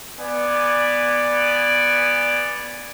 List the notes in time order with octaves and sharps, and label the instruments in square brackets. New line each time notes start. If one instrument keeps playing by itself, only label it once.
[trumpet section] B3 D5 G#5